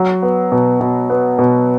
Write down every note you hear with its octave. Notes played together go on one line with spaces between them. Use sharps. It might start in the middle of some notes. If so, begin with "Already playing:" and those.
Already playing: F#3
B3
B2
B2
B3
B2